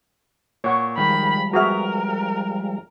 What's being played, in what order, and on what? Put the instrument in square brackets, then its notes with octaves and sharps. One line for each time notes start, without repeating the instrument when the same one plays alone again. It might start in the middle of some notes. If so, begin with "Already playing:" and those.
[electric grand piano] A#2 [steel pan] C#5 F#5 C#6
[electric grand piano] D#3 [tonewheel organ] F3 G3 G#3 [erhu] B5
[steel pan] F#4 G#4 E5 [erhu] A#4 [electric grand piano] B4 F6